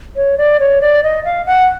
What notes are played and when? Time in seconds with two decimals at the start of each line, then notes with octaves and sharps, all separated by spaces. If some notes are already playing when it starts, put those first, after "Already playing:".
0.16 C#5
0.38 D5
0.60 C#5
0.81 D5
1.03 D#5
1.25 F5
1.46 F#5